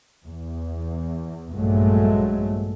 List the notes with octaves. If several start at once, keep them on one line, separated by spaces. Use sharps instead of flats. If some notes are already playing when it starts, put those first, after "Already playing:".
E2
A#1 G2 F#3 G#3 A3